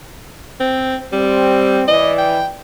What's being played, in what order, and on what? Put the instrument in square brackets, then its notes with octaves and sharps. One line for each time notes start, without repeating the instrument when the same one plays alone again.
[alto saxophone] C4
[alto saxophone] G3 [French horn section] C4
[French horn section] E3 D5 [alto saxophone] D#5
[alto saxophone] G5